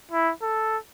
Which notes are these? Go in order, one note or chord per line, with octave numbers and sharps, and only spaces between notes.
E4
A4